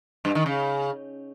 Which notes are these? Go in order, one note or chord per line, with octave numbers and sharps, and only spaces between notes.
G2
D#3
C#3